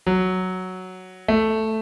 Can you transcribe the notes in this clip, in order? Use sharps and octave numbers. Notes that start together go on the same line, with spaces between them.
F#3
A3